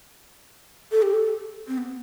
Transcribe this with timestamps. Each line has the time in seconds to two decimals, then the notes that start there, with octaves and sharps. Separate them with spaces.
0.92 A4
1.02 G4
1.13 A4
1.68 C4
1.78 B3